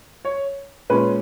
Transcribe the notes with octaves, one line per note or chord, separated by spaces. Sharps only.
C#5
A#2 G#3 C#4 B4